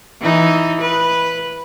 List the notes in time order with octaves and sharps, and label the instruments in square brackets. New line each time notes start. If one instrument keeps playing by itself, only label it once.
[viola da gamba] E3 D#4
B4